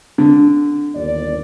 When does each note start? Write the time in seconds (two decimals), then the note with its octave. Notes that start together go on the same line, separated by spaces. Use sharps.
0.18 D3
0.94 G1 D#2 D5